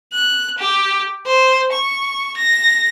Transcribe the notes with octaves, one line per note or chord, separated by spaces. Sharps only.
F#6
G4
C5
C#6
A#6